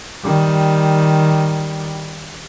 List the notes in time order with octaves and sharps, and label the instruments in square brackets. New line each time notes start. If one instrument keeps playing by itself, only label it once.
[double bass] D#3 G3